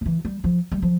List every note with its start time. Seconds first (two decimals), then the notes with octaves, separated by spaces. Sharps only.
0.01 D3
0.06 E3
0.25 G3
0.44 F3
0.72 G3
0.82 F3